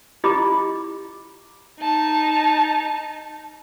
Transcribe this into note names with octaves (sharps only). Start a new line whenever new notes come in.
E4 F4 G4 D#5 B5 D6
D#4 A5